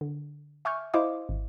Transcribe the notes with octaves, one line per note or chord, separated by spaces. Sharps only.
D3
E5 G#5 C#6 D6 F6 G6
E4 C5 D#5 F5 D6
G#1